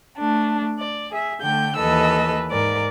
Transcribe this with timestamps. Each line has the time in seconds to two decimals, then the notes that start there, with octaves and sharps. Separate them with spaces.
0.19 A3 D4
0.77 D5
1.11 G#4 E5
1.43 D3 A3 G5 G6
1.78 D#2 E3 A4 B4 D#5 E6
2.51 G#2 A#4 D5